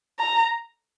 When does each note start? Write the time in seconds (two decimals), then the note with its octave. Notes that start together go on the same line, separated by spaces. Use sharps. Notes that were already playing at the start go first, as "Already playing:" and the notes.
0.19 A#5